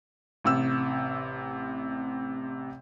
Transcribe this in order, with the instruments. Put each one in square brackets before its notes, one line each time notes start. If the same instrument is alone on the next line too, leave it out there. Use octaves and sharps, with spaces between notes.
[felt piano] A1 C3 E6